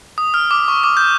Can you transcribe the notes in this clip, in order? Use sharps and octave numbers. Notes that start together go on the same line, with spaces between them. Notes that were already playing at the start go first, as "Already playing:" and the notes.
D#6
F6
D6
C#6
D6
G6